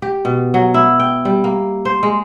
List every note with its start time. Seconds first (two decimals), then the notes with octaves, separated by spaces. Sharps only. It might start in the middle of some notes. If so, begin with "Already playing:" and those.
0.02 G4
0.25 B2
0.54 F#3
0.74 E4
1.00 G5
1.25 G3
1.44 A#3
1.85 C5
2.03 G#3